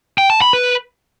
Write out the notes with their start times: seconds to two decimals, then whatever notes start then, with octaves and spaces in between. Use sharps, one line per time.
0.18 G5
0.30 A5
0.42 B5
0.53 B4